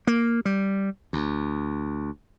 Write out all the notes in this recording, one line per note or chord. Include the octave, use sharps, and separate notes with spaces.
A#3
G3
D2